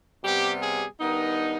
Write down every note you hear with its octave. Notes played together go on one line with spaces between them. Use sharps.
C3 G3 B3 G4
G#4
G2 D#3 B3 D#4